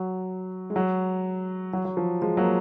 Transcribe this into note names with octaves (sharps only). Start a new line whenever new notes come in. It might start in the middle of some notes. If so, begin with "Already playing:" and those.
Already playing: F#3
G#3
F#3
F#3
F#3
F3
F3 G#3
F#3 A#3